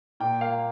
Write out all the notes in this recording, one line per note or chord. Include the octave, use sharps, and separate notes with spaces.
A#2 G5
A#3 F5